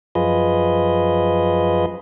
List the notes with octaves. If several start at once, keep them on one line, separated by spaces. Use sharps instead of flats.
F#2 F3 F4 G#4 B4 D#5